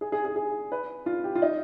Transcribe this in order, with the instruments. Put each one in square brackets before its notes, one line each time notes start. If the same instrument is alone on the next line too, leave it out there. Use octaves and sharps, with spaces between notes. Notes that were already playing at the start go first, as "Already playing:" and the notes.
[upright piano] G#4
G#4
G#4
G#4
B4
F4
G4
F4
D#4